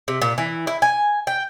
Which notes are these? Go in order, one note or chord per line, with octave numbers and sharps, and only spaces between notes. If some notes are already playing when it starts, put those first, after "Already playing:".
C3
A#2
E3
E4
G#5
G5